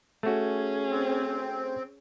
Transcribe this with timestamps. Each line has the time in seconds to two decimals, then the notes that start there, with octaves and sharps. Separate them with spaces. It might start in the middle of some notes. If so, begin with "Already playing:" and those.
0.23 A3 C#4 F#4 G#4
0.91 C4